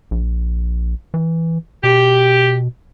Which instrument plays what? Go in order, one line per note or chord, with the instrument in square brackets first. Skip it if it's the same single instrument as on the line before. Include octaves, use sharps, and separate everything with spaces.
[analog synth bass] A#1
E3
[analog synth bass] B2 [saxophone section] G4